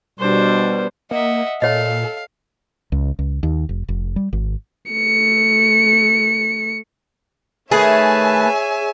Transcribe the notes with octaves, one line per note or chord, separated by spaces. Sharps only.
B2 G3 D4 C5
A#3 D#5 E5 F#5
A#2 A4 C#5 D#5 F5
C#2
C#2
D#2
F1
F1
G3
G#1
A3 C#7
D#3 A3 G#4 B4 C#5 E5 G#5 A5